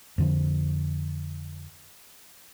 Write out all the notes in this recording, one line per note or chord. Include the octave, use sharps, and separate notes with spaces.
F2 D3 F3